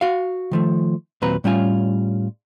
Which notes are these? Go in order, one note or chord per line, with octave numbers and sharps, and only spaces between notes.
F#4 F5
D#3 F3 A3
D#2 A#2 F#3 C4 B4 A#5
A2 G3 C#4 F4 G#5